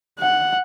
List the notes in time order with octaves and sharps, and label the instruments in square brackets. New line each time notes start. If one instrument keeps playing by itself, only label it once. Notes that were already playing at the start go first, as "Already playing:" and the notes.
[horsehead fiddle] F#5